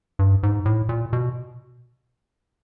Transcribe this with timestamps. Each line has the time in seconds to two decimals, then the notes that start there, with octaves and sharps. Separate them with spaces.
0.19 G2
0.43 G#2
0.65 A2
0.89 A#2
1.13 B2